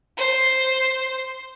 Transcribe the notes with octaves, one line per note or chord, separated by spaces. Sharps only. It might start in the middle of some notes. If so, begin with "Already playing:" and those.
C5